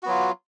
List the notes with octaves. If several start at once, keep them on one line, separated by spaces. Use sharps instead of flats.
F#3 B3 F4 F#4